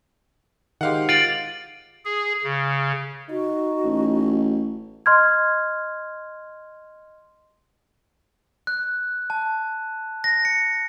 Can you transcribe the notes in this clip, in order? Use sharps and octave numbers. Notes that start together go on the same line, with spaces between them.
D#3 G#3 G4 C5 F5 F#5
F4 A6 D7 F#7
G#4
C#3
D#4 F#4
A1
D#5 C6 F6 G#6
F#6
A5
A#6
C#7